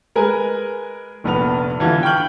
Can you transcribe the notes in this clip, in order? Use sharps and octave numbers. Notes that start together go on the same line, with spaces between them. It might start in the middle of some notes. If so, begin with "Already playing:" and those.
G#3 A#4 B4 G#5
F1 A#1 B3 F7
D3 E3 F4
G5 C#6 F6 G6 F#7